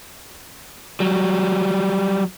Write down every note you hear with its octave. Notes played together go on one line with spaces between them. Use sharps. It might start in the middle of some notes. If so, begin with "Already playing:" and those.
F#3 G3